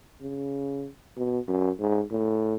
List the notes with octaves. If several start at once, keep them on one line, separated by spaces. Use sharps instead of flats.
C#3
B2
F#2
G#2
A2